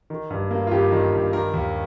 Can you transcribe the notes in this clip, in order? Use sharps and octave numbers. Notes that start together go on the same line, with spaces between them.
D#3
G2
A#3
F4
G2 G4
D#3
G2
D#3 A#4
D#2